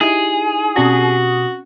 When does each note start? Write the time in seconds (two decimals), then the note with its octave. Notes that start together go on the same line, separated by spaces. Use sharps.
0.01 D#4 E4 G4 G#4
0.76 B2 C4 C#4 F#4 G4 D5 D#6